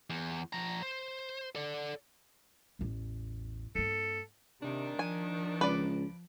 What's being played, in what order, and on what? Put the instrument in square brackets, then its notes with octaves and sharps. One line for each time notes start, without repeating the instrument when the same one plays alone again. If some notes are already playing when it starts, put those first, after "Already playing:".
[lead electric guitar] E2
F3 A#5
C5
A4 D5
[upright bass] A1 E2
[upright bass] G2 A#3 [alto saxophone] A4
[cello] C3 [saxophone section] D#3 D4
[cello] F3 [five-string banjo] G#5
[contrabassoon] C#2 [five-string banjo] B4 D5